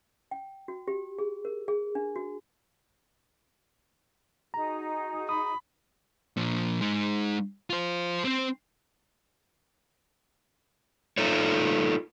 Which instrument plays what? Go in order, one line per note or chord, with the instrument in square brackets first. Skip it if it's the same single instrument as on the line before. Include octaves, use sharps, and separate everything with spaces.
[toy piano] G5
F#4
G4
G#4
A#4
G#4
D4
F#4
[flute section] D#4 F#4 G#4 [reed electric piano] A#5
[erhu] B5 [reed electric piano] D#6
[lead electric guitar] A#2 F3
G#3 D#4
F4 C5
C4 C5
[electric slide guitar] D#4 F4 A4 C#5